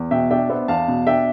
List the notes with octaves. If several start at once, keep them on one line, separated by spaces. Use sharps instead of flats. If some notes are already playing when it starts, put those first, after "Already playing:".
Already playing: E2
B2 E5 G5
D4 E5 G5
B3 C5 E5
E2 F5 A5
B2
D4 E5 G5